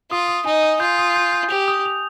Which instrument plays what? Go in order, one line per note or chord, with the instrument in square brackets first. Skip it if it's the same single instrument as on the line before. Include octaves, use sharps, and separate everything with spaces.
[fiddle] F4 [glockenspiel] D#6
[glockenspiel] D#6
[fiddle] D#4 [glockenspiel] G#5
[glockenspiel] D#6
[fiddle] F4 [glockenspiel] G6
[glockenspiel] D#6
G6
G6
[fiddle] G4 [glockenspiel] F7
[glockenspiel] D#6
F7